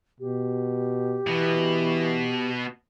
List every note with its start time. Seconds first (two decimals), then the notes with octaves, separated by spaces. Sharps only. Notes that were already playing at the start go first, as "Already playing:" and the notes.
0.20 B2 G4
1.27 B2 E3